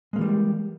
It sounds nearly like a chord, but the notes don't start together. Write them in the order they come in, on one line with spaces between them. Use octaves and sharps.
G#3 A#3 E3 G3